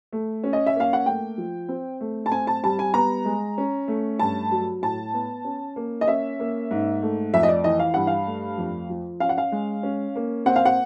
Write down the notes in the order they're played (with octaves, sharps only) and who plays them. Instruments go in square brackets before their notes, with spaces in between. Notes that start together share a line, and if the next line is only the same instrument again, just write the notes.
[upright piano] A3
C#4
D#5
E5
A#3 F5
F#5
A3 G5
F3
C4
A3
A5
C4 G#5
A5
G3 A5
G#5
B3 A#5
G#3
C#4
A3
G2 A5
F#3
A2 A5
B3
C#4
A#3
D#5
C#4 E5
A#3
G#2
A3
F2 E5
D#5
D5
E3 D#5
F5
G2 F#5
F5
A3
F2
F3
C#4 F5
F#5
F5
G#3
C#4
A#3
C4 F#5
F5
F#5